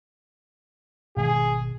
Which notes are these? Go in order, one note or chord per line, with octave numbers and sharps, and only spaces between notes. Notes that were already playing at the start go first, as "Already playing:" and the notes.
G#1 B2 G#4